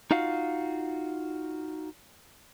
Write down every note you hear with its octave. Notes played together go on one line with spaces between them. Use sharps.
D#4 F4 F#4 F5